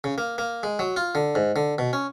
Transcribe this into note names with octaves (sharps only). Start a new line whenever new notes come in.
C#3
A#3
A#3
G#3
F#3
F4
D3
G#2
D3
B2
C#4